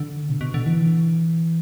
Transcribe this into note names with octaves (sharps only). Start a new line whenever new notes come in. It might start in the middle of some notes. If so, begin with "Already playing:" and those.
Already playing: D3
B2
B2
D3
E3